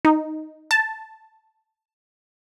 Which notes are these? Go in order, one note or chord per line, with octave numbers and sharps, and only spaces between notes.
D#4
A5